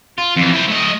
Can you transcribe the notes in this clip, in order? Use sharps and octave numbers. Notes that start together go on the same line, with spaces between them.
F4
F2 E3
E4 C5
A3 D#5